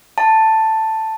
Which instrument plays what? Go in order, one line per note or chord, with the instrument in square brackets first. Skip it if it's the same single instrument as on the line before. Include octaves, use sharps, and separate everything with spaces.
[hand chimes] A5